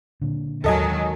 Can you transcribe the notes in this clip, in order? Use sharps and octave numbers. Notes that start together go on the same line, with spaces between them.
A#2 D3
D#2 G#2 D#3 F#3 A4 D#5 G#5